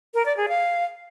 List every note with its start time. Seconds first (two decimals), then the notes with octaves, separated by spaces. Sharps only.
0.14 A#4
0.25 D5
0.37 G#4
0.48 F5